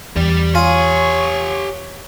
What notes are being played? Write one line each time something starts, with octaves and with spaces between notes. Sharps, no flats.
E2 G3 D5
F4 G4 C#5 G#5